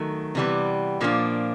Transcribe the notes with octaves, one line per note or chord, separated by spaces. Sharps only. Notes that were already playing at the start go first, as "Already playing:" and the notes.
Already playing: D#3 F#3 A3
C3 E3 G3 B3
A#2 F3 A#3 D4